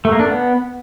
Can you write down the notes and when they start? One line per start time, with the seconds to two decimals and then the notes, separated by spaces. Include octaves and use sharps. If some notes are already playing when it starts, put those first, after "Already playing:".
0.05 A3
0.12 A#3
0.20 D4
0.27 B3